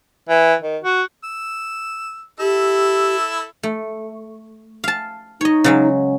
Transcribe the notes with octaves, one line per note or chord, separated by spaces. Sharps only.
E3
D#3
F#4
E6
E4 G4 A4 E6
A3
F5 A5
D#4 C#5 D#5
C#3 F#3 G#3